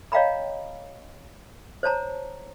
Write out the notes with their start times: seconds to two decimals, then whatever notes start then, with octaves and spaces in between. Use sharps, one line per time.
0.12 C#5 D#5 F5 G5 A#5 B5
1.83 C5 C#5 A5 A#5